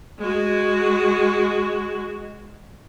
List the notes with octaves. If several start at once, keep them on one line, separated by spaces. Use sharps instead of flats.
G#3 F#4